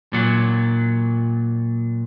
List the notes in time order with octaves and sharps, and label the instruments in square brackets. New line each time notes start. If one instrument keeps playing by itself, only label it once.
[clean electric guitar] A#2 F#3